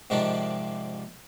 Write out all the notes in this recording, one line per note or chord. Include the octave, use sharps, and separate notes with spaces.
G#2 C3 D#3 F3 D4